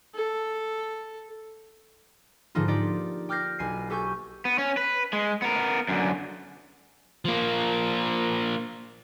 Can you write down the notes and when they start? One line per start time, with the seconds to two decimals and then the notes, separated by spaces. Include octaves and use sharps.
0.15 A4
2.55 G#2 D3 F3 A#3 D#4 F4
2.68 D#4 F4 G4 D5
3.29 G5 D6 F6 G6 A#6 C7
3.59 B1 G#5 C7
3.90 G4 A4 G#5 C#6 G6
4.45 B3
4.58 C#4
4.77 B4
5.13 G#3
5.42 B3 A#4
5.89 F#2 D3
7.25 F3 A#3